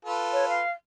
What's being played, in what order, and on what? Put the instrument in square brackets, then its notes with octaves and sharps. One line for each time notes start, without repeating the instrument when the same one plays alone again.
[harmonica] F4 A4 B4
[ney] C#5
F5